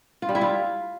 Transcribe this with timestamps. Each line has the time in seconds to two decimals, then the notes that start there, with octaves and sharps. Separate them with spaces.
0.22 F4
0.29 G3
0.35 E4
0.41 F4